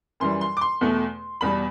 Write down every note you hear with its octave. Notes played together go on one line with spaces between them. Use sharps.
F#2 E3 G3 C6
C6
D6
C6
E2 B2 A3
E2 B2 G3 B5